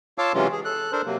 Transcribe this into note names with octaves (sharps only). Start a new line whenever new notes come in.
F4 C#5 F5 A5 D6 E6
C3 E3 F#3 G#3 C#4 F4
G#4
A4 F#6
D4 A4 A#4 C5
C3 F#3 A#3